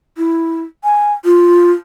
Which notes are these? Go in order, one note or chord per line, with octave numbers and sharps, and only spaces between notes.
E4
G#5
F4